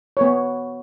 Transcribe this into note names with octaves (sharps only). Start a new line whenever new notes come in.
B3 C#5